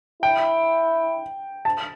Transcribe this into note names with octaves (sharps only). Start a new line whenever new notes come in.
E4 G5
A5